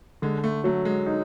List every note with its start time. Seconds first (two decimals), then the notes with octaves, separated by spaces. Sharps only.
0.22 D3 G#3
0.44 A3
0.64 F#3 A3
0.85 G#3
1.06 D#4